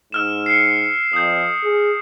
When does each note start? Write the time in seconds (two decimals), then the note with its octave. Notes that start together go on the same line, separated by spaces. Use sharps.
0.12 G#2 E6 F6 E7
0.46 C7 C#7
1.13 F2 D#6 G6
1.64 G#4